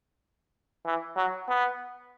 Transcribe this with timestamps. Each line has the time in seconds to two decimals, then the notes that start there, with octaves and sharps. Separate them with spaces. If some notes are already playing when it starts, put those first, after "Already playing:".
0.85 E3
1.16 F#3
1.48 B3